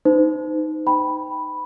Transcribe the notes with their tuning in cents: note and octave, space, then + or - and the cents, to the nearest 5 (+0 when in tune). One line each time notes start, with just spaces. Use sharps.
D#4 +0 C5 -40
G5 +0 B5 -5